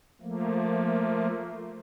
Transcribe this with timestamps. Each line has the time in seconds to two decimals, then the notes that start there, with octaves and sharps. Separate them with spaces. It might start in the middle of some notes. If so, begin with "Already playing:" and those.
0.21 F3 A3 A#3